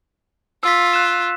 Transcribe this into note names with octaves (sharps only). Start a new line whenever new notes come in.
F4 E6 B6
F#6 E7